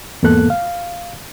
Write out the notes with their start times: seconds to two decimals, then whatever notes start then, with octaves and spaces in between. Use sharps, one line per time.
0.23 E2 G#2 A#3 B3 A4 F#6
0.50 F5